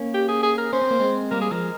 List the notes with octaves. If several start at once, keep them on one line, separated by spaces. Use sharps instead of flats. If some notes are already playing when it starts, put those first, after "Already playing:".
Already playing: A#3 C#4
G4
G#4
G#4
A#4
C#4 C5
C4
A#3
G#3 C4
G3 A#3 A#4
G#4
F3 G#3 A#4